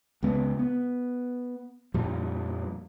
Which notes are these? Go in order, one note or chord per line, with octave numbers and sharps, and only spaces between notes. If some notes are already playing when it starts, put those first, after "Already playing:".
C#2 C#3 G#3 B3
B3
F2 A#2 F3 G3